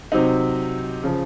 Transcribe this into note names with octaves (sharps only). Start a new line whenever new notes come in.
C3 F#3 C4 D#4
C#3 F3